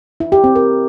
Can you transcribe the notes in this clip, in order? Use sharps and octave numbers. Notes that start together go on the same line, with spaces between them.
E4
G4
C4
A#4